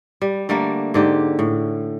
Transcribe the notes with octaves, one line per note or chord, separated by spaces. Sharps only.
G3
D3 G3 A3 A#3
G#2 D3 G4
A2